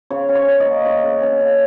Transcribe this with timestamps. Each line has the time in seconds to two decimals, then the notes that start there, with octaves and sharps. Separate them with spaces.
0.10 C#3 C#5
0.29 C#4
0.35 C#5
0.48 C#4
0.60 D#5
0.66 A#3
0.85 C#4 C#5
1.04 C#3
1.22 C#4
1.41 C#3